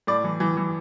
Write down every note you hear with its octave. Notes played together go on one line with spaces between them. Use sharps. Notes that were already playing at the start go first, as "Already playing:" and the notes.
A2 D5
E3
E3
E3